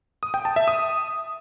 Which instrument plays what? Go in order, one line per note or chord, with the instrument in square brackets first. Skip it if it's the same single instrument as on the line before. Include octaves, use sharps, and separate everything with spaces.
[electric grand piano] D#6
G5
A5
E5
D#6